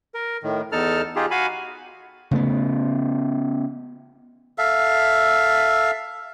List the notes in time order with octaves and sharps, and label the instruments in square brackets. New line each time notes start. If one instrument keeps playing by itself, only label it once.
[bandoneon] A#4
A2 D#3
E2 D#4 A4 A5 F6
D#4 F4 G4 G#4
F#4 F5 G#5 B5
[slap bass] C#3 A3 B3
[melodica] A4 E5 F5